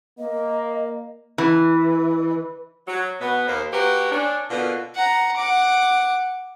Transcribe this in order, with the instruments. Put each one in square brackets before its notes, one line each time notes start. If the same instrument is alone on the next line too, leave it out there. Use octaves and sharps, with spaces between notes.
[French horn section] A#3 [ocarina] D#5
[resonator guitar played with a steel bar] E3
[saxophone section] F#3
B2 B3
D#2 D#3 A#3 C5
A#3 F#4 G4 B4
C#4 D4
B2 D3 A#3 B3 F4
[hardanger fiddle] F#5 A#5
F#5 D6